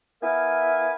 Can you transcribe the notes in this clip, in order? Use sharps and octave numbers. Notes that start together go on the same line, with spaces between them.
B3 E4 A#4 E5 F5 G#5